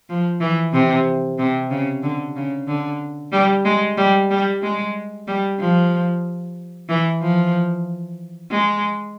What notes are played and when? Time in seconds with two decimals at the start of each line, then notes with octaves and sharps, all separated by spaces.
0.09 F3
0.41 E3
0.73 C3
1.39 C3
1.71 C#3
2.03 D3
2.36 C#3
2.67 D3
3.32 G3
3.65 G#3
3.97 G3
4.31 G3
4.63 G#3
5.27 G3
5.60 F3
6.89 E3
7.22 F3
8.51 G#3